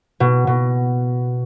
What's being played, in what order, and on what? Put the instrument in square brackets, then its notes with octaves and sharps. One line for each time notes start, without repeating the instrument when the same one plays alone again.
[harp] B2
B2